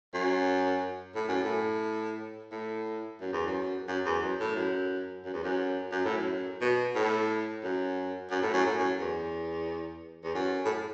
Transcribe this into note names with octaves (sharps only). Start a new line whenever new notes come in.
F#2
A2
F#2
A2
A2
F#2
E2
F#2
F#2
E2
F#2
A2
F#2
F#2
E2
F#2
F#2
A2
F#2
B2
A2
F#2
F#2
A2
F#2
A2
F#2
E2
E2
F#2
A2